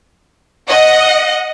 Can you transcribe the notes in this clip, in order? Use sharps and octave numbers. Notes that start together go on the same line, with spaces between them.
D#5 F#5